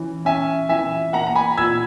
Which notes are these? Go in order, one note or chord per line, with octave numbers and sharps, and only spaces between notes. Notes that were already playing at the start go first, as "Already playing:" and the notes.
Already playing: E3 C#4
C#4 E5 G#5
E3 E5 G#5
A#3 F#5 A#5
A#5
G#5 B5
A#2 E6 G#6